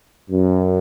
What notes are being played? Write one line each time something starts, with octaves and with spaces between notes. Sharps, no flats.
F#2